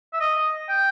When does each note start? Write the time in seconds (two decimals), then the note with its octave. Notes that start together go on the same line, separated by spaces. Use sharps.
0.13 E5
0.20 D#5
0.69 G5